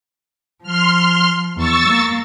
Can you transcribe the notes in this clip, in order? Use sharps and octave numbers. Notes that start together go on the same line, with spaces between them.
F3 C6 F6
E2 C#6 E6 A6
A#3